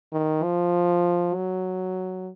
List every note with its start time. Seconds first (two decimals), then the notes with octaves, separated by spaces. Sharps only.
0.13 D#3
0.44 F3
1.35 F#3